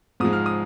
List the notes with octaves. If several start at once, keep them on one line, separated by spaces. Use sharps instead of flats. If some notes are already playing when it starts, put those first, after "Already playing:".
G#2 F3 G#3 D#6
F6
D#6